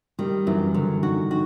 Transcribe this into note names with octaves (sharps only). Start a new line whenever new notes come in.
D#3 G3
F#2 E3
F#2 D3
D#3 F#4
D#3 F#4